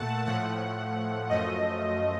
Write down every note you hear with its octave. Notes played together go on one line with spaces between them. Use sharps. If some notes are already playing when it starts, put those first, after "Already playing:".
Already playing: A#2 A3 F#5 A5
A2 F3 A3 F#5
F#2 F3 A3 D#5